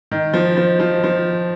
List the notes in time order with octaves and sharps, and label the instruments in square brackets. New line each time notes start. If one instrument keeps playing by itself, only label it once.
[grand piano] D#3
F3
F3
F3
F3